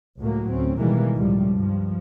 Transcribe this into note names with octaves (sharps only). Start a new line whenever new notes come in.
C#2 A2 F#3 A3 A#3
D2 C4 C#4
B2 D#3 E3 G3 G#3 A#3
C#2 A2 F3 G3
G2 F3